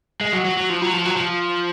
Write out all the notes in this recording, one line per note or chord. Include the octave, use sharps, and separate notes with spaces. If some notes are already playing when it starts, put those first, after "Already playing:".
G#3
F#3
F#3
F#3
F3
F#3
F3
F#3
F3